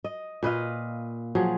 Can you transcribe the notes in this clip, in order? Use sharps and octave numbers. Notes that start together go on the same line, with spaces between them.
D#5
A#2 B4 D#5 F5
F3 F#3 G#4